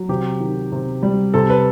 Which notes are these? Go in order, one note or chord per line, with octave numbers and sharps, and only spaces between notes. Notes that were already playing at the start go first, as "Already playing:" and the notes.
Already playing: F#3
C3 G4
D#3
C3
G3
C3 A4
B4